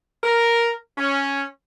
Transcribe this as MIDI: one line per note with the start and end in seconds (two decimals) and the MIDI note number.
0.23 0.71 70
0.98 1.43 61